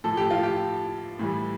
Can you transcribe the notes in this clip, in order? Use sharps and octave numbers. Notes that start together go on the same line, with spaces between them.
A2 F3 A4
G4
F4
G4
A2 E3 G3